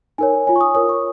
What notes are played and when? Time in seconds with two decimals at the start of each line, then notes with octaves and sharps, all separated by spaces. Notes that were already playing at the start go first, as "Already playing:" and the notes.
0.18 D#4 A#4 C#5 G#5
0.47 F4 C#5 G#5
0.56 C#6
0.61 D#6
0.74 F4 A#4 C#5 D#6
0.89 C#6